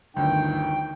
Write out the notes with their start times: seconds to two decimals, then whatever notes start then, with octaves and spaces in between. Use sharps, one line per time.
0.16 G1 D2 D#3 G5